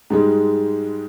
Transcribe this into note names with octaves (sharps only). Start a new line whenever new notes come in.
G#2 G3 G#3